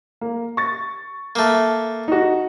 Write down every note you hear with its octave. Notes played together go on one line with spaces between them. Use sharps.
A#3
C#6 A6
A3 A#3
D#4 F#4